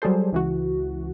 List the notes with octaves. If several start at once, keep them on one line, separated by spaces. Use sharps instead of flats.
F#3 G3 G#4 A4 C5
C#2 E3 F#4